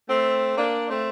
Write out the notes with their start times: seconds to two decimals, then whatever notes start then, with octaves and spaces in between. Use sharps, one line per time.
0.09 A3 C4
0.56 A#3 D4
0.88 A3 C4